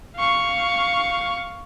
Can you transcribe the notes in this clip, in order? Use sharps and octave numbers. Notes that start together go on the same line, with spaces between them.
F5 C#6